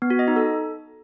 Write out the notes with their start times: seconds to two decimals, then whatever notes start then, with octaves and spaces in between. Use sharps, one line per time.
0.02 B3
0.10 F#4
0.19 D#5
0.28 D#4
0.36 A4